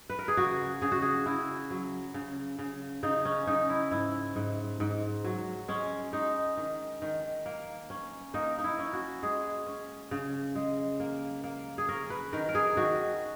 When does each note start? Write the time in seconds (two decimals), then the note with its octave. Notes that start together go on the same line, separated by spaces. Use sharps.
0.10 B4
0.19 A#4
0.28 G#4
0.37 C#3 F#4
0.82 C#3 G#4
0.92 F#4
1.02 G#4
1.26 C#3 E4
1.70 F#3
2.14 C#3
2.59 C#3
3.03 C#3 D#4
3.25 C#4
3.47 C#3 D#4
3.70 E4
3.91 G#2 E4
4.36 G#2
4.80 G#2
5.24 F#3
5.68 G#3 C#4
6.13 G#3 D#4
6.57 D#3
7.02 D#3
7.46 A#3
7.90 C#4
8.34 A#3 D#4
8.59 D#4
8.64 E4
8.79 C#4
8.93 F#4
9.23 G#3 G#4
9.67 C#4
10.11 C#3
10.55 G#3
11.00 A#3
11.44 A#3
11.78 G#4
11.88 C#4 A#4
12.10 B4
12.33 D#3 A#4
12.49 A#4
12.55 G#4
12.77 D#3 F#4